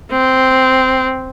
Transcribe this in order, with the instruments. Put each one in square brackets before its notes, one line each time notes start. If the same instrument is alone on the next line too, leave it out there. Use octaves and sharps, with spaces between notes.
[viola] C4